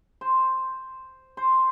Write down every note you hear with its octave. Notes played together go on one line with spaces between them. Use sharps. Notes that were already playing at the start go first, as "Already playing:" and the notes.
C5
C5